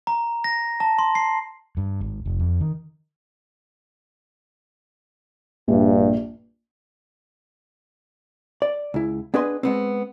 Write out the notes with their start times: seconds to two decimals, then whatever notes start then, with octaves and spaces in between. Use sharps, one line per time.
0.07 A#5
0.44 A#6
0.80 A5
0.99 C6
1.15 C7
1.77 G2
2.01 G#1
2.26 F1
2.40 F2
2.61 D#3
5.68 A#1 G2
8.62 D5
8.94 C#2 E4
9.34 B3 D4 G#4 B4 D#5 C6
9.63 G#3 B3 C4